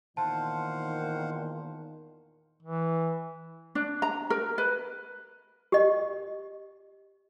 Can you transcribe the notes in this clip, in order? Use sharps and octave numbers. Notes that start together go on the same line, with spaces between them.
E2 A#2 D#3 C5 F5 F#5 A5
E3
D4
A#5
A#4
B4
G4 D#5